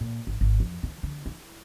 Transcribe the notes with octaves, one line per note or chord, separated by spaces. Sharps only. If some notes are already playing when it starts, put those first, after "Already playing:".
A#2
G#1
G#1
F2
D#3
D3
E4